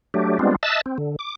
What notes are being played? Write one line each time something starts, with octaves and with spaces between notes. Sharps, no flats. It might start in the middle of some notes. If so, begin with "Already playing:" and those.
F#3 A3 D4 G4
G3 G#3 B3 C4 D4 F4
D#5 E5 A5 E6 F#6 A6
C4
D3
D6